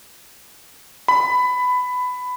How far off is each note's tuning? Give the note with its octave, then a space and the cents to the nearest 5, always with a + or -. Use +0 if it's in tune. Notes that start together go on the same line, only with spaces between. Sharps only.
B5 +15